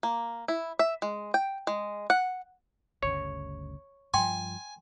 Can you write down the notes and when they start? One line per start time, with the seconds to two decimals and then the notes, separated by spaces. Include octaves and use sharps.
0.03 A#3
0.48 E4
0.79 E5
1.02 G#3
1.34 G5
1.67 G#3
2.10 F#5
3.03 G1 D2 C#3 C#5
4.14 G2 F3 G5 G#5 C6